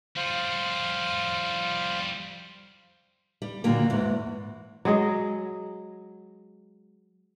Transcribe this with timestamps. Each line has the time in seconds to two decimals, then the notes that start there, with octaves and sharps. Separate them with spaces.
0.17 F3 G3 C5 F5
3.42 G3
3.64 A#2 D3 D#3 F#3 A#3
3.90 E2 G#2
4.85 F#3 G#3 G#4 D#5